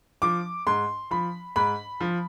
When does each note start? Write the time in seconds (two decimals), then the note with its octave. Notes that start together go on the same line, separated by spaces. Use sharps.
0.22 F3 D6
0.67 G#2 C6
1.11 F3 B5
1.56 G#2 B5
2.01 F3